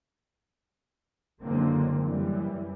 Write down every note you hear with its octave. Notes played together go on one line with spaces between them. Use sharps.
F#1 D3 F#3 G#3 A#3 C4
F#2 E3 G3